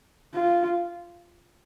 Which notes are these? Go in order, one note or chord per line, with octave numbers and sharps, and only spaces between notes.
F4